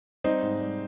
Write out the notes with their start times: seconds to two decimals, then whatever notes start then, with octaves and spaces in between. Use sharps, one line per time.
0.24 G3 C4 D#4
0.43 G#2
0.60 G3